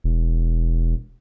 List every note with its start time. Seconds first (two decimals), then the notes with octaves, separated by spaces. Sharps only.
0.04 E1